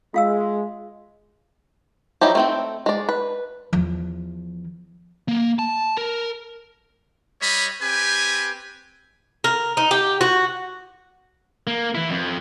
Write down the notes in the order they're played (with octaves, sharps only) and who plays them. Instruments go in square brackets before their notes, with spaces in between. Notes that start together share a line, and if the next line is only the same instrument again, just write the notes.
[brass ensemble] G#3 [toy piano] F4 F5 E6
[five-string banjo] F3 F#3 D#4 E4 G4
A3 C4 G5
G#3 D5
B4
[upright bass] E2 F3
[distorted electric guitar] A#3
A5
A#4
[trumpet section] G3 C#5 D#5 B5
C4 G4 B4 G#5
[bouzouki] A#4
D#4
G4
F#4
[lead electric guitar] A#3
E3 E4
F2